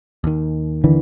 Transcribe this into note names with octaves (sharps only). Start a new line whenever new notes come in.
D#2 D#3
D3 E3